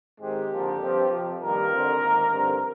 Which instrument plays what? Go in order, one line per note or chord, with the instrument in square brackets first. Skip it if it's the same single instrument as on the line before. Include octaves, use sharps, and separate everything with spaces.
[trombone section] G#2 D#3 G#3 C4 G4
F2 D3 F3 A#3
G2 F3 C4
F2 C3 F3
G2 D#3 G3 A#3 A#4
F2 D3 F3 C4
G#2 D#3 A#3
G2 D3 F3 C4